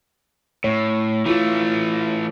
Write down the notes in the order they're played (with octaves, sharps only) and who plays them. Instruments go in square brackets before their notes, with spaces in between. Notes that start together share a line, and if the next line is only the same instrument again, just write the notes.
[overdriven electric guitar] A2 [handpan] C#5
[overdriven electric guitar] E3 A3 [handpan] E4 F4